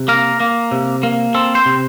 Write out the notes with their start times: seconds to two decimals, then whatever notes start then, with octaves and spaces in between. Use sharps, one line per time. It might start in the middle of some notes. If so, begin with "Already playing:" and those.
Already playing: C3
0.08 A#3 A#4
0.40 A#3
0.72 C3
1.03 A#3
1.35 C4 A4
1.55 C5
1.66 C3